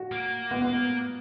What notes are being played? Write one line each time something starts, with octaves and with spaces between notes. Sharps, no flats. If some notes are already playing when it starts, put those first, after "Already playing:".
Already playing: F#4
A#3
B3
B3